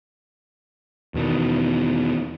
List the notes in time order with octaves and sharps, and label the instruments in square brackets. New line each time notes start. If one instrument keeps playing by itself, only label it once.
[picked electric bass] E2 B2 D#3